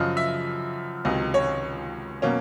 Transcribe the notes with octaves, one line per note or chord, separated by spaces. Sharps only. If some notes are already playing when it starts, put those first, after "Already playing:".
Already playing: F#2 C#3 F3 D#5
E5
C#2 C3 D#3 F#3 D#5
C#5
B2 F#3 A#3 C#4